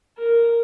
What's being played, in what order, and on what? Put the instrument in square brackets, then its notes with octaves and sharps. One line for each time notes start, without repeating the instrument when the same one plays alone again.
[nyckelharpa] A#4